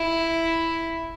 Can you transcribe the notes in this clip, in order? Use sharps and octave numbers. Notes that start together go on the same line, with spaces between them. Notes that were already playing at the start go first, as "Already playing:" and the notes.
Already playing: E4